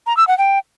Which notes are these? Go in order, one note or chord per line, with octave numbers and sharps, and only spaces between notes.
A#5
E6
F#5
G5